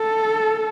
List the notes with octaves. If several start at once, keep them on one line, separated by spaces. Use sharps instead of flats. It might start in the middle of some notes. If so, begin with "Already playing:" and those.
Already playing: A4